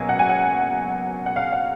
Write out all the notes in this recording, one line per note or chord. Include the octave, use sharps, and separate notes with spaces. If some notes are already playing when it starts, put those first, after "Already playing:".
Already playing: C#2 B2 F#3 A#3 G#5
F#5
G#5
F#5
F#5
F5
F5